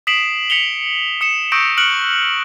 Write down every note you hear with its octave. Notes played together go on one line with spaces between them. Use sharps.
D#6 B6 C7 D7 E7 F#7
B6 C#7 F7 G7
D#6 C#7 E7
C#6 D#6 E6 G6 A#6 D7
F6 F#6 C#7 D7 F#7